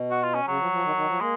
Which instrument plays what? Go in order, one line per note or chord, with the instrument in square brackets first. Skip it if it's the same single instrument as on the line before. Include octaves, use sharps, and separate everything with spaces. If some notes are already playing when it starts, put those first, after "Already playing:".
Already playing: [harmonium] B2
[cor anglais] F#4
F4
C#4
[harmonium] C#3 [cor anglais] F#3
[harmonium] F3
F3
D#3
D#3
F3
[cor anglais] G#3 [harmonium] A#3